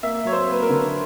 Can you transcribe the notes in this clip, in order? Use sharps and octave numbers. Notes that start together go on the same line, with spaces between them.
A#3 E5
F#3 C#5
C5
A#3 B4
A#4
D3